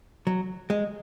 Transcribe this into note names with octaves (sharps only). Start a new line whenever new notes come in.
F#3
G#3